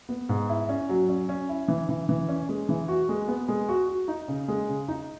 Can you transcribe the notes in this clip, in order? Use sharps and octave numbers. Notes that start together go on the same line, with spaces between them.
B3
G#2
E4
C#4
F#3
C#4
C#4
E4
E3
E3
E3
C#4
G#3
E3
F#4
G#3
B3
G#3
F#4
F#4
D#4
C#3
G#3
C#3
D#4